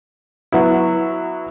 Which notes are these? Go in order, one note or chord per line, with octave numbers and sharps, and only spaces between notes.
F#3 B3 E4